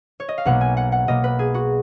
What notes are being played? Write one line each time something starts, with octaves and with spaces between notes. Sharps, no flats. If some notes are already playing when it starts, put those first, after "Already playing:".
C#5
D#5
F5
B1 B2 A#3 F#5
G#5
F#5
F#5
B1 B2 A#3 D#5
B4
G#4
F#4